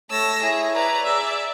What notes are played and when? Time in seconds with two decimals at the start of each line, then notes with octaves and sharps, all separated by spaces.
0.11 A3 C#5 A5 E6 A#6
0.43 E4 G#4 C#5 G#5
0.75 B4 D5 A#5
1.05 G#4 D5 E5